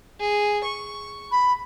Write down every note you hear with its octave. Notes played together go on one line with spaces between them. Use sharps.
G#4
C#6
B5